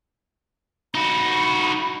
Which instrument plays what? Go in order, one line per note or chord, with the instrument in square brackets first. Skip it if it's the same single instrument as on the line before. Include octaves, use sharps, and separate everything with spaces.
[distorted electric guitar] D#4 F#4 [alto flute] B5